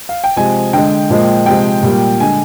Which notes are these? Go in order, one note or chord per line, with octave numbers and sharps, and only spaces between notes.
F5
G5
C3 F3 G#3 G#5
D3 G#3 G5
A#2 F3 G#3
C3 F3 G#3 G5
A#2 G3
D3 G#3 G#5